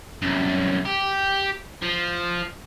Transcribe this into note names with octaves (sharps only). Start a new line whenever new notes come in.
C2 F#2
G4
F3